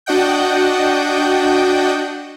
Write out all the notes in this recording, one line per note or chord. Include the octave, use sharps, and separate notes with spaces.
D4 F#4 D#5 F#5 G5 G6